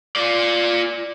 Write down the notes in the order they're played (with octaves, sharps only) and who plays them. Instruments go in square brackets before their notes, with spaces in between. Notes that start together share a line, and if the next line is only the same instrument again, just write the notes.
[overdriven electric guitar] F4 D5